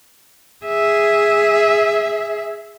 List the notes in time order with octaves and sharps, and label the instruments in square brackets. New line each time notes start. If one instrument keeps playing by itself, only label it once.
[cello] G#4 E5